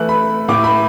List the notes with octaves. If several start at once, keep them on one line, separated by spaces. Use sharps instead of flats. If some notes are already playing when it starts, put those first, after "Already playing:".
Already playing: E3 A3 E4 F#6
B5
A2 A3 E4 D6
B5